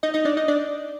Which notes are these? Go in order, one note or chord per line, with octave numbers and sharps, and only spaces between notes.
D#4 D#5
D#4 D#5
D4 D5
D#4 D#5
D4 D5